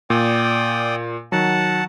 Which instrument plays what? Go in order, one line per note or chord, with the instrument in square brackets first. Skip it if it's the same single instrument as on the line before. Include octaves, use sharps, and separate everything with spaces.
[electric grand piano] A#2 [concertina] D5 G5 D#6
[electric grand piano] D#3 F#3 [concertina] F#5 A5